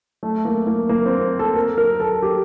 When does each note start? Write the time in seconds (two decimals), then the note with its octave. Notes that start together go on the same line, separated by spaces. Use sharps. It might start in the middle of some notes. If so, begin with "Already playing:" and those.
0.23 A3
0.45 A#3
0.67 A#3
0.89 A#3
1.05 C4
1.39 A4
1.56 A#4
1.78 A#4
2.00 A4
2.22 G4